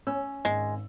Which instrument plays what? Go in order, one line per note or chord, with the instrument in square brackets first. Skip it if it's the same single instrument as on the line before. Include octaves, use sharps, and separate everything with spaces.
[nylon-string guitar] C#4 [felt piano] E6
[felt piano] G#1 [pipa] G#3